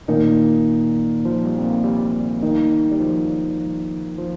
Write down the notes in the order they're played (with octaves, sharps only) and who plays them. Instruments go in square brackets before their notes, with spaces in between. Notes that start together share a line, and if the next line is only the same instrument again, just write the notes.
[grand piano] A#2 A#3 D#4 [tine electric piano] D#3
[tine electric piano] F3
G3
C4
A#3
G3
[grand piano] D#3 A#3 D#4
[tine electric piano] G3
F3
F3